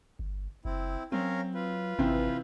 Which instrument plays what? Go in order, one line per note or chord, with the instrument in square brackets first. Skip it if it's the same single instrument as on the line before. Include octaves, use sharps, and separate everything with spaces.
[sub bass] G1
[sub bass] F#1 [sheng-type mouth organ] C4 E4
[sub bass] F#3 [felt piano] C4 [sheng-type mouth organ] C#4 A#4 F5
[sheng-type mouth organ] F4 B4
[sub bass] G#1 [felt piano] C3 E3 C4